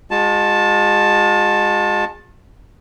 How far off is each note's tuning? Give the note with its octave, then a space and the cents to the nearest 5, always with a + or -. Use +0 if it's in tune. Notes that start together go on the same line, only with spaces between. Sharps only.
G#3 -20 F4 +45 A5 +0